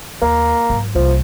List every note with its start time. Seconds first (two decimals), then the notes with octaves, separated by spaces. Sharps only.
0.22 D#2 A#3
0.70 G#2 F#3
0.95 C2 F3 A#3